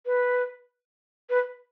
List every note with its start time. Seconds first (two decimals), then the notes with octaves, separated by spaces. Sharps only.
0.06 B4
1.30 B4